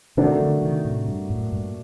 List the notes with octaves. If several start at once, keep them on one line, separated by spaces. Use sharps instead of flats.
C3 D#3 A3 D4 F#4 A#4
D3 F#3
C3 D#3
A2 C3
G2
F#2 A2
G2 A#2